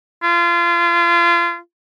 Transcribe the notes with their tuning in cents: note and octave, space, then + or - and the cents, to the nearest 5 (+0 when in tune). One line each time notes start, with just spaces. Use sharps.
F4 -30